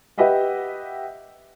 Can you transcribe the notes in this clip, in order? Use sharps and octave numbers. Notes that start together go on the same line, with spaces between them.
G4 B4 D#5 E5 F#5